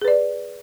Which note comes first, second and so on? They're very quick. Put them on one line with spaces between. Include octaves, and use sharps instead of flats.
G#4 B4 D5